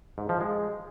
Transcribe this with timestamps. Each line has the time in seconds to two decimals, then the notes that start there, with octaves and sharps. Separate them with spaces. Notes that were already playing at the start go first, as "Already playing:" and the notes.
0.18 G#2
0.29 F3
0.41 G#3